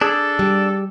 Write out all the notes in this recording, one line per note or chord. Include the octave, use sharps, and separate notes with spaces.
D4 G#4 A4
G3